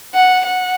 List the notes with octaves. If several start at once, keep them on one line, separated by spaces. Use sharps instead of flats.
F#5
F#5